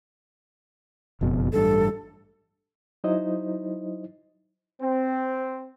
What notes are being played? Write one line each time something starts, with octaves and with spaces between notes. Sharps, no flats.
F#1 F2 B2
A1 G2 A4
F#3 D#4 E4 C5 D#5
C4